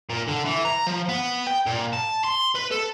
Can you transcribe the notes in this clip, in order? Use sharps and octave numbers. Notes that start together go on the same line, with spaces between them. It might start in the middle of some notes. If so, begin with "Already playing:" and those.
A#2
D3
E3
A#5
F3
B3
G5
A#2
A5
C6
B4
A4